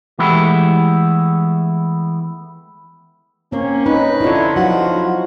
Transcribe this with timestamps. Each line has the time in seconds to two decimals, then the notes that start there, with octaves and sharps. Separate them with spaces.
0.19 E3 G#3 A3 B3 E4 G4
3.52 A#3 C4 C#4 C#5
3.86 D#4 B4
4.21 D3 E4 F4 C#5
4.56 F3 F#3 D#4 F4 F#4